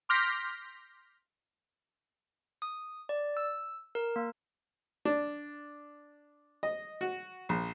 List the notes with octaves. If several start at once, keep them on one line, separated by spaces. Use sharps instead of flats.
C6 D6 F6 G6 A#6 B6
D#6
D5
E6
A#4
A#3
D4
D#5
F#4
A#1